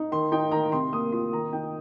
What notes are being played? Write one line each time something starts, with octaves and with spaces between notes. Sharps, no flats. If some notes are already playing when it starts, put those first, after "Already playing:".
Already playing: D#4
D#3 C6
D#4 G5
D#3 A#5
C3 C6
A#3 D#6
F4 C6
D#3 A#5
D#4 G5